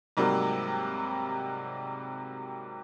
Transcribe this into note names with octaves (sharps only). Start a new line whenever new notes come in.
G#2 C3 F#3 G3 A#3